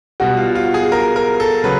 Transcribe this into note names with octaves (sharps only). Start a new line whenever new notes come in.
B2 G3 F#4
F4
F4
G#4
A#4
A#4
A4
C#3 F#3 B4